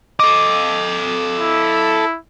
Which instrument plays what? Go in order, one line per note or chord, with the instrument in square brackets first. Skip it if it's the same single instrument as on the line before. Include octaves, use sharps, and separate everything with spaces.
[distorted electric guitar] A4 D#5 [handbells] D6
[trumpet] E4